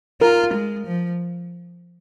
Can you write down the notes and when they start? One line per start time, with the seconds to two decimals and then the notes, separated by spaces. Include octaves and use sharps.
0.21 F4 A#4
0.54 G#3
0.86 F3